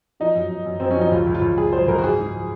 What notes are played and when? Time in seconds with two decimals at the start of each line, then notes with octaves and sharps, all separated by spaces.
0.20 F3 D#4
0.35 F#2
0.50 F#2
0.66 F#2
0.80 F#2 C4
0.91 C#4
0.97 F3 D#4
1.11 C#2 F4
1.27 C#2
1.34 F4
1.42 C#2
1.58 C#2 G#4
1.72 F#3 C5
1.88 C#2 A#4
1.98 F#4
2.03 G#2 G#4
2.19 G#2
2.34 F3